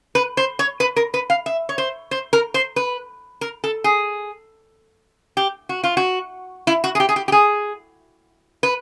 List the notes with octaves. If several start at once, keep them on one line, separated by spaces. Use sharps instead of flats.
B4
C5
C#5
B4
A#4
B4
F5
E5
C#5
C5
C5
A#4
C5
B4
A#4
A4
G#4
G4
F#4
F4
F#4
E4
F#4
G#4
G4
G#4
G4
G4
G#4
B4